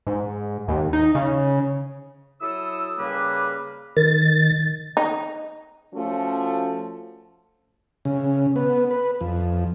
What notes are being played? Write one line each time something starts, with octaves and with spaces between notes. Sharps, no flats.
G#2
D#2
D#4
C#3
F#3 E4 A4 D#6 E6
C#3 G3 A#3 B4
D#3 A6
D#4
F3 A3 C#4 F#4
C#3
B3
B4
F2